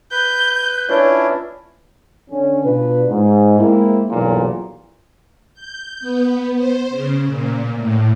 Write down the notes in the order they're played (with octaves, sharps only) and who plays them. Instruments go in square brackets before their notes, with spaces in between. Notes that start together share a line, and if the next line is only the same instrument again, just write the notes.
[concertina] B4 [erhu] G6
[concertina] C#4 D4 E4 [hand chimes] F4 B4 C#5
[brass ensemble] D3 C#4
B2 D4 F4 B4
G#2
G#3 A#3 C4 E4
B1 E2 G2 A#2 E3
[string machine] G6
B3
C5
C#3
A#2
A2